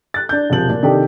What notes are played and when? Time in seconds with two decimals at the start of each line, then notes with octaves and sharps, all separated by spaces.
0.14 F#6 A6
0.29 D4 G6
0.50 E1 C3 F3 F#7
0.69 A#2
0.83 C3 D#3 D4 D#4 G4 A4